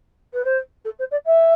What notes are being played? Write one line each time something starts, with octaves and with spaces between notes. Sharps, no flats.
B4
C5
A4
C5
D5
E5